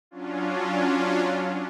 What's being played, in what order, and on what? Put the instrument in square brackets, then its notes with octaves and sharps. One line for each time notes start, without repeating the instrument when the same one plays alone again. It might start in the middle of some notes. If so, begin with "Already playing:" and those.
[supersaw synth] F#3 C#4 D4 F4